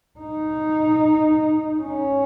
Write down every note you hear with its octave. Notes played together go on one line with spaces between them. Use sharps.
D#4
C#4